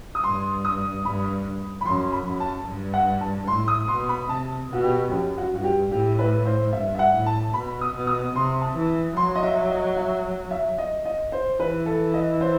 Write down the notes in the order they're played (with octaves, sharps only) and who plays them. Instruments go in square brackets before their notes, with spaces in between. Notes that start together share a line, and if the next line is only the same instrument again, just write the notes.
[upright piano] D#6
[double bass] G2 [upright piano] C6
[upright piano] D#6
[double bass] G2 [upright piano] B5
[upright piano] B5
[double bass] F#2 [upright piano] C6
[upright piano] B5
[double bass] F#2
[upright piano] A5
[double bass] G2
[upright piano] F#5
A5
[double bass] A2 [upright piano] C6
[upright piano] D#6
[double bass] B2 [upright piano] C6
[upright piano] B5
[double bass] C3 [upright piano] A5
[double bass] B2 [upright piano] F#4
[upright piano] G4
[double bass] F#2 [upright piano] G4
[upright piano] F#4
[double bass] G2 [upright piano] F#4
[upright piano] G4
[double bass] A2 [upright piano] G4
[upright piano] B4
C5
[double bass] G2 [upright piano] E5
[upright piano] E5
F#5
[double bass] A2
[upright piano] A5
[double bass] B2 [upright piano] B5
[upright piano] D#6
[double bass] B2
[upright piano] D#6
[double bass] C3 [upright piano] C6
[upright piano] A5
[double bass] E3
[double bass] F#3 [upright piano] C6
[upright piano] D#5
E5
D#5
E5
E5
D#5
D#5
C5
[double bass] E3 [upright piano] B4
[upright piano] A4
D#5
C5